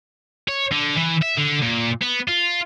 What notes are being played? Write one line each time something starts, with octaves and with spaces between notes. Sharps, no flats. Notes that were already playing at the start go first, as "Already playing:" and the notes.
C#5
D3
E3
E5
D3
A#2
B3
F4